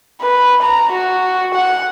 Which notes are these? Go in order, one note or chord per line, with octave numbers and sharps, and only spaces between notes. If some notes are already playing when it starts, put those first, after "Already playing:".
B4
A#5
F#4
F#5